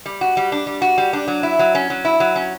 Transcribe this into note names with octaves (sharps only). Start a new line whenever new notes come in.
G3
F#4
G3
D4
G3
F#4
G3
D4
F#3
E4
F#3
C#4
F#3
E4
F#3
C#4